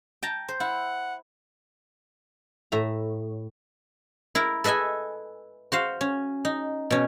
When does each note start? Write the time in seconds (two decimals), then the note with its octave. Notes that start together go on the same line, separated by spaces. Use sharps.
0.23 G5 A5 A#5
0.48 C5
0.60 E4 F#5
2.72 A2 E5 A#5
4.35 E4 A#4
4.64 A4 B4 D#5 E5 G#5
5.72 F#4 C5 F5
6.01 C#4
6.45 D#4
6.90 B2 C#4